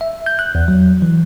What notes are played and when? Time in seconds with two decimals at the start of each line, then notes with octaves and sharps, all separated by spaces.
0.01 E5
0.26 G6
0.39 F#6
0.55 E2
0.68 F#3
1.02 E3